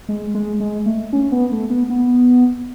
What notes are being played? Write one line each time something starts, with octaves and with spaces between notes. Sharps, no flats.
G#3
G#3
G#3
A3
C#4
B3
A3
B3
B3